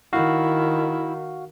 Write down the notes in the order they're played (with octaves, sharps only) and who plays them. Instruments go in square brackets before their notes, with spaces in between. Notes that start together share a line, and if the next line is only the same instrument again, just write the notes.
[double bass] D#3 [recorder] E4 [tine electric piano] F#4 F5